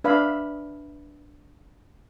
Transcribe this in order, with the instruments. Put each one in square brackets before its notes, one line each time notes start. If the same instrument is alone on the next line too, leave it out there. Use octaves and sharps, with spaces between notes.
[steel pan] D4 B4 E5 F5 B5